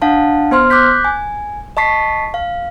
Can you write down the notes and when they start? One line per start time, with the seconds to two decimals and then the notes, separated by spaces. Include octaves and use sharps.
0.02 D4 F5 F#5 A5
0.51 B3 C5 C6 F6
0.70 D6 F#6 G6 B6
1.04 G#5
1.77 D#5 A5 C#6 B6 C7
2.34 F5